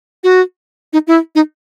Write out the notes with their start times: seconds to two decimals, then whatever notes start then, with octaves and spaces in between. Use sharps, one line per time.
0.24 F#4
0.93 D#4
1.07 E4
1.35 D#4